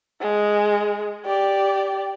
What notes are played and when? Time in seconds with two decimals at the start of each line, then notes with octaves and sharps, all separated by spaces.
0.21 G#3
1.25 G4 D5